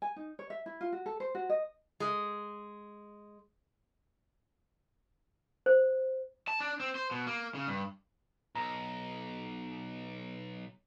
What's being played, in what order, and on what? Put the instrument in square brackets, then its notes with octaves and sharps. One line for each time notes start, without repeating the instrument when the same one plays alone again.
[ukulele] G#5
D#4
C#5
E5
E4
F4
F#4
A4
C5
F#4
D#5
[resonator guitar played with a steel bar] G#3
[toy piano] C5
[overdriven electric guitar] A5
D4
C4
C5
B2
A#3
C#3
G2
[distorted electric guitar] B1 [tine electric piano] A#5